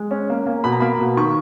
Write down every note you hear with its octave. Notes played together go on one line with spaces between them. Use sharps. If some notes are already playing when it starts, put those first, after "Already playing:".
Already playing: G#3
C#4
A#3
A#3
B2 B5
A#5
A#3 B5
B2
D#3 C#6